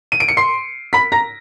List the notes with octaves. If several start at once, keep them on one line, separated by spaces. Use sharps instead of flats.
D#7
D7
C#7
C6 C7
B5 B6
A#5 A#6